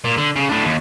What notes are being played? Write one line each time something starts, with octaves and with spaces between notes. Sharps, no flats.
A#2
D3
C#3
A2 D4
D#2